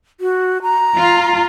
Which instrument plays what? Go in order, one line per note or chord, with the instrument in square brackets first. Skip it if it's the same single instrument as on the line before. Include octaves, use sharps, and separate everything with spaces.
[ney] F#4
A#5
[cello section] F4